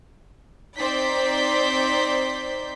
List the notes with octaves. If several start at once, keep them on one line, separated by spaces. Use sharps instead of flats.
C4 D#4 C5 D5 G6 B6